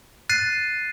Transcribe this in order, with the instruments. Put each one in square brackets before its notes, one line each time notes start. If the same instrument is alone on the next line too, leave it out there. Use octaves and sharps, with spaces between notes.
[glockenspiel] F#6 A6 C7 D#7